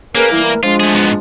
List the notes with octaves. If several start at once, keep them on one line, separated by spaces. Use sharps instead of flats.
A#3 C#4 G#4 A#4 B4
E3 G3 E4
A#4
F3 G#3 D4 F4
A3 G#4
G#2 B3